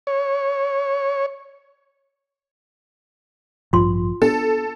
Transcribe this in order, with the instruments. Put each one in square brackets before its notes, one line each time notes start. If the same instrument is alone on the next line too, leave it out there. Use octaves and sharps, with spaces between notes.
[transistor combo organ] C#5
[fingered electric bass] A1 G2 F3 [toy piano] F4 C6
[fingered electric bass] B3 D4 [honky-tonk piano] A4